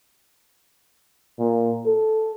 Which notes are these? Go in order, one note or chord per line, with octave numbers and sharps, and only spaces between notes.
A#2
A4